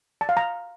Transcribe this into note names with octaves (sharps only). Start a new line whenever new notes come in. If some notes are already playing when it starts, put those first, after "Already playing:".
A5
F5
A#5